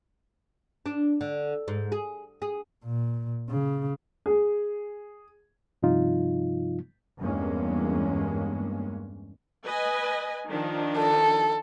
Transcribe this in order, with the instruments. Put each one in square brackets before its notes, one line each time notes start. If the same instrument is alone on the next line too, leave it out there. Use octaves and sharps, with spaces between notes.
[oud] D4
D3
G#2
G#4
G#4
[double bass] A#2
C#3
[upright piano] G#4
[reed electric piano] G2 C3 F3 D#4 F4
[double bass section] E2 G2 G#3 A#3 C#4
[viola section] B4 D#5 G#5
D#3 F3 D4
[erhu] A4